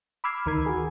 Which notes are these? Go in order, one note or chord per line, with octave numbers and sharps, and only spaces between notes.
B5 D6 E6 F6 G#6 C7
D2 D#3 A#4 B5 G#6
F#4 G#4